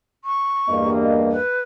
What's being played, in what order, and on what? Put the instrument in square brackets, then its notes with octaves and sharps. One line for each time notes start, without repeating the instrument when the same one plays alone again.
[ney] C#6
[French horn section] E2 G2 D#5 [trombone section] A#3
[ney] B4